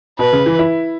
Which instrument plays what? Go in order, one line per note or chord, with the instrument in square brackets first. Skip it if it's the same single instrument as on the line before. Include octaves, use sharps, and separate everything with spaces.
[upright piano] B2 [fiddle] B4
[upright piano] C#3
E3
E4